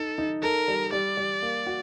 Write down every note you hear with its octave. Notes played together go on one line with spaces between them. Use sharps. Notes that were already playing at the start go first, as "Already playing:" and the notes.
Already playing: D#4 A4
D#4
A4 A#4
G3
G3 D5
G3
A#3
F#4